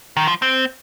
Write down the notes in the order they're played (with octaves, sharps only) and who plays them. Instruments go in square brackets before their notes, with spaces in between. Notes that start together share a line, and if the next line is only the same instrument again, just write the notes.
[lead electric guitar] D#3
F3
C4